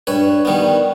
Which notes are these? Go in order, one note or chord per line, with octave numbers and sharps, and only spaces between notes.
G2 B4 C#5
D#3 G3 B3